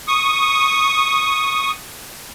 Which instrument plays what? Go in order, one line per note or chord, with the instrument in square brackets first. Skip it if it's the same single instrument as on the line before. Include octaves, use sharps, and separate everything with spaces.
[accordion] C#6 D#6